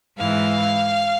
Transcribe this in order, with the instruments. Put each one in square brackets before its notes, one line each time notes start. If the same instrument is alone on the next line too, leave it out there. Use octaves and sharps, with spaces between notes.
[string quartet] G#2 E3 F5